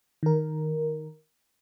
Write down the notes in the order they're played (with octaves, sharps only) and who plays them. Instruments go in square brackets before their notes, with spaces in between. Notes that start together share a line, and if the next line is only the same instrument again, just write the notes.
[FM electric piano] D#3 A#4